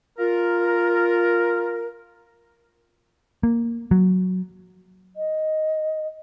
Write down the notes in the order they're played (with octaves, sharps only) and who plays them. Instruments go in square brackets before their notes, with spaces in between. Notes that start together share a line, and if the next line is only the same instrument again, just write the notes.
[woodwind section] F4 A#4
[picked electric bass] A#3
F#3
[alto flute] D#5